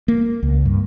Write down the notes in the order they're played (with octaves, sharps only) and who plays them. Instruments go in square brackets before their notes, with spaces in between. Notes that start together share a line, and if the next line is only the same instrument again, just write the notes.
[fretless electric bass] A#3
C#2
G2